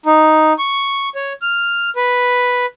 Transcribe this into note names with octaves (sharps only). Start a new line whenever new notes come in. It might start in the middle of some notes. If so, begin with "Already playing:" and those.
D#4
C#6
C#5
F6
B4